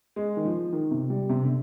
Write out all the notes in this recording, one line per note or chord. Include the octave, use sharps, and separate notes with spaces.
G#3
D#3
F3
D#3
C3
G3
C3
D3